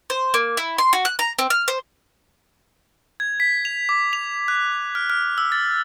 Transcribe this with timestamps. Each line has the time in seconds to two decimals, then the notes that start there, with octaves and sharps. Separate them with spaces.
0.10 C5
0.34 A#3
0.57 E4
0.78 C6
0.93 F#4
1.05 F#6
1.19 A#5
1.39 C4
1.50 F6
1.68 C5
3.20 G#6
3.40 B6
3.65 F7
3.89 D6
4.13 F7
4.48 F#6
4.95 F6
5.10 F6
5.38 E6
5.52 A6